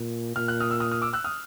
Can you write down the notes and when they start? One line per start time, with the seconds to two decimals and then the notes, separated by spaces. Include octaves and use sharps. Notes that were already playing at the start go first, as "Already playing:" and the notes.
Already playing: A#2
0.36 A#2 F6
0.48 F#6
0.60 D#6 F6
0.71 E6
0.80 D#6 F6
0.91 D#6 F6
1.02 D6 E6
1.13 E6 F#6
1.24 D#6 F6